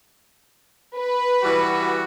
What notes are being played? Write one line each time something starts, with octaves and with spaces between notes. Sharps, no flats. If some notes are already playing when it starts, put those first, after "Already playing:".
B4
E3 G3 F#4